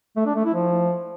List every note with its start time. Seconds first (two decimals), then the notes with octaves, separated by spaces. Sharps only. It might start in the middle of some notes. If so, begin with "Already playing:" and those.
0.17 A3
0.26 D4
0.35 A3
0.45 E4
0.54 F3